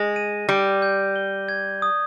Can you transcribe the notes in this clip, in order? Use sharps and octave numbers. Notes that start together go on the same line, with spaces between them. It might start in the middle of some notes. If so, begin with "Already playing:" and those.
Already playing: G#3 A#6
D#7
G3 G6
G6
G7
G#6
D#6